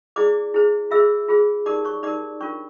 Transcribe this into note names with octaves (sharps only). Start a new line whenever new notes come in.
E4 G#4 C5 D5 D6
E4 G#4 C5
F4 G#4 C5 E5 E6
F4 G#4 C5
D#4 G4 A#4 D5 D6
C#5 C#6
D#4 G4 A#4 D5 D6
D4 F4 A#4 C#5 C#6